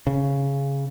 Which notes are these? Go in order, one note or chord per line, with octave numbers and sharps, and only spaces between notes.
C#3